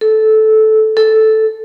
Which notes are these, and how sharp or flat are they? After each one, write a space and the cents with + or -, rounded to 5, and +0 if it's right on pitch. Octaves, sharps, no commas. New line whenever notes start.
A4 -15
A4 -5